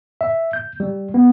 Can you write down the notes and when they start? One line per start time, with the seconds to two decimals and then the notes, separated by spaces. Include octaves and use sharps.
0.21 E5
0.53 G6
0.80 G3
1.14 B3